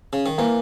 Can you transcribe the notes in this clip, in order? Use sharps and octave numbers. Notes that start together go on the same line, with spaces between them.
C#3
D#3
E3 A#3